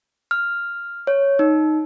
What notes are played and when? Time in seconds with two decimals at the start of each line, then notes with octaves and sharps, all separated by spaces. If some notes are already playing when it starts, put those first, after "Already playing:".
0.31 F6
1.07 C#5
1.39 D#4